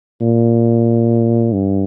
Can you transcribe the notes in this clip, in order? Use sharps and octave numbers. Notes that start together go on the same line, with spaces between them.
A#2
G2